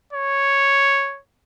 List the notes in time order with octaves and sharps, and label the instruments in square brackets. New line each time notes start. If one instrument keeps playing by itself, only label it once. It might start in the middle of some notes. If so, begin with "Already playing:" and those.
[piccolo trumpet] C#5